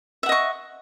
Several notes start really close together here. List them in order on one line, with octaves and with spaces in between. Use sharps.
E5 F#5 D#5 C#6